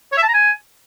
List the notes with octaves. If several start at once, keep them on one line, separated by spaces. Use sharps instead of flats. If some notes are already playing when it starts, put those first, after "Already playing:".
C#5
E5
A5
A#5
G#5